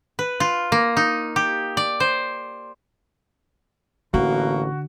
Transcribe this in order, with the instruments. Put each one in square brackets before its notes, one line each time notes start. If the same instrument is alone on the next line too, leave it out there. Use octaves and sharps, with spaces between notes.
[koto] B4
F4
A#3
D#4
G4
D5
C5
[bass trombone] A1 [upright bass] D3 [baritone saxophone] A#3 [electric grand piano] F#4